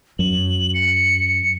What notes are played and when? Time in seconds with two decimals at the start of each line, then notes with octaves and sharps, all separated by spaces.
0.19 F#2 F#7
0.74 C#7